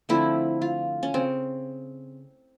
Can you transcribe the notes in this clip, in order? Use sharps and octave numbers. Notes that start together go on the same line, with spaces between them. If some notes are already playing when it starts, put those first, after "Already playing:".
D3 F3 A3 C4 E4
F4
C#4
C#3 C4